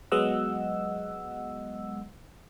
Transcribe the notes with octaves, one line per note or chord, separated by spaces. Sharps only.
F#3 G#3 B3 D#5 F#5 E6